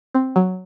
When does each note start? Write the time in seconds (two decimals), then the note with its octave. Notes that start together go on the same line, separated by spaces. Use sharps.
0.14 C4
0.36 F#3